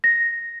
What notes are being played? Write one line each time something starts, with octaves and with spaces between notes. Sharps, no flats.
A#6